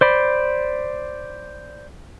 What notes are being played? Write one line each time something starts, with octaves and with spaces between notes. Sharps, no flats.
C5 D5 B5